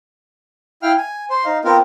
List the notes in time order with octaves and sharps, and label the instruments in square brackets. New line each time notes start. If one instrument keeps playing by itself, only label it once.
[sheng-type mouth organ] E4 F5 G5 F6
G#5
C5 C6
D#4 F5
B3 C4 F4 A#4